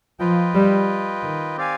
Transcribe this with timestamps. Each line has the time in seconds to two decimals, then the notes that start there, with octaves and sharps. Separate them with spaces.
0.19 F3 F4 B4 D#5 G5
0.54 G3
1.22 D#3
1.57 C4 G4 D5 F5 G#5